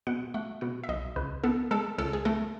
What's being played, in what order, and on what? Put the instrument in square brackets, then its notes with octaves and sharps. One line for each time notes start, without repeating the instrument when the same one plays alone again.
[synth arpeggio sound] B2 F#5
A3 F#5
B2 F#5
E5
B1 D#5
C#2 B4
B3 A4
G#3 A4
C#2 A4
G#4
A3 A4